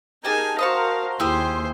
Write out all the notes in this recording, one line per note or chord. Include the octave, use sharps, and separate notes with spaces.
D#4 G4 G#4 A#4 G#5 A5
F#4 A#4 C5 D#5 F5 A5 C#6
D#2 E4 G4 G#4 C5 C6